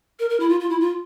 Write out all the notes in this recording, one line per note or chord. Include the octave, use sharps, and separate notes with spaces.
A#4
A#4
E4
F4
F4
E4
F4